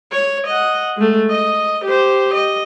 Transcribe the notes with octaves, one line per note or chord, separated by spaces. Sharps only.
C#5
D#5 F#5
G#3 A3
D#5
G4 C5
D#5